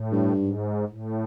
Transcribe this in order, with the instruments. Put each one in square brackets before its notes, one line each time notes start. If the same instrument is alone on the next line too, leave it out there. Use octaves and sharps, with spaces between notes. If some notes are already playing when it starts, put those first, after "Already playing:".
Already playing: [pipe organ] A2
[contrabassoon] G2
[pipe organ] G#2
A2